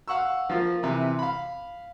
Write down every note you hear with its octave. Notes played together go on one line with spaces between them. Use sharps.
F5 F#5 C#6 E6
F3 A#3 F4
C3 E3
F5 B5